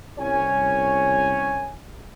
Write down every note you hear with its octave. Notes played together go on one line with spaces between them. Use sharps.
C2 C#4 C#5 G#5